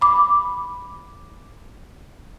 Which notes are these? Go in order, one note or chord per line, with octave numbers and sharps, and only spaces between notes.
B5 D6